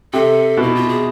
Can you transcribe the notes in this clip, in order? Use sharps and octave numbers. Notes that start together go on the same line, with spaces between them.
C3 A4
B2
E4
F4
G#4